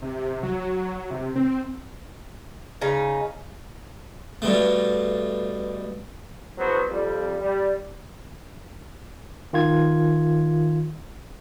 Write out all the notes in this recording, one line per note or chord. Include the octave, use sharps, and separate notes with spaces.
C3
F#3
F#3
C3
C4
C#3 D#4
G2 B2 A3
E2 F#3 B3 C5
F2 G3
G3
D#3 F4 G#6